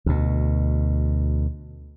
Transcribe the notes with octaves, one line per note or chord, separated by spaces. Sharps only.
D2 B2